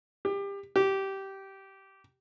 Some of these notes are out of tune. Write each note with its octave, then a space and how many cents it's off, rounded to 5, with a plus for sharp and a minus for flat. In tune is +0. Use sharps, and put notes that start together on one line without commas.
G4 +25
G4 -15